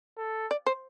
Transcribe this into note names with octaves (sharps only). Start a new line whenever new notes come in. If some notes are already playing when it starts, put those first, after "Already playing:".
A4
D5
C5